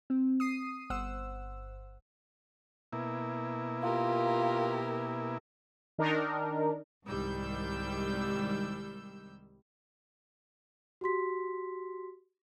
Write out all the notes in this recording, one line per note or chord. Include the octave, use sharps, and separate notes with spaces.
C4
D#6 C7 D#7
G1 C5 F#5 E6
B2 A#3 E4
F4 G4 A#4
D#3 D4 D#4 A#4
C2 G#2 D#3 G3 E6 G6
F#4 G4 C6 B6